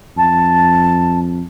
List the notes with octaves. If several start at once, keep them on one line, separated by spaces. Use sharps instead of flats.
F2 A5